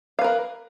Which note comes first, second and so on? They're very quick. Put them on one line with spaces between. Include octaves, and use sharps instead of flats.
F5 B4 A#4